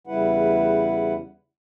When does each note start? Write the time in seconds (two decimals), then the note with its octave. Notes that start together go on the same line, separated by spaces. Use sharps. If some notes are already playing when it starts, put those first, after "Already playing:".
0.07 E2 C#3 G3 E4 B4 F#5